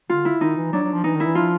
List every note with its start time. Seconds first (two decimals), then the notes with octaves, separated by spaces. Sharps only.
0.09 D3 F4
0.25 E4
0.41 D#3 D#4
0.56 E3
0.72 F#3 D4
0.84 F#3
0.93 F3
1.04 E3 D#4
1.15 D#3
1.20 E4
1.25 E3
1.35 F3 F4